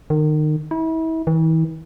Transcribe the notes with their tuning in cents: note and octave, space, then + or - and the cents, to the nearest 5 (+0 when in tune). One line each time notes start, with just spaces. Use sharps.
D#3 -30
E4 -35
E3 -40